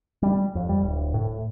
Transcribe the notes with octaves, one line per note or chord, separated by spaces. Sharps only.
G3
F2
G3
D1
A2